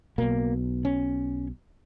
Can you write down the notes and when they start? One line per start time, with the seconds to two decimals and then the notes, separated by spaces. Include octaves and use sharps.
0.18 B1 B2 A#3
0.85 C#4